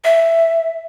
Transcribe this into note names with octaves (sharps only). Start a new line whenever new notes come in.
E5